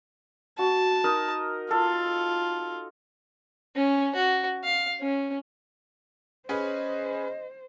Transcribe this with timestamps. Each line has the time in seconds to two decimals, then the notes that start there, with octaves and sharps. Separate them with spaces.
0.59 F#4 A5
1.04 D#4 A#4 D#5
1.71 F4 A4
3.76 C#4
4.15 F#4
4.64 F5
5.01 C#4
6.49 C#4 G#4 B4 C5 D#5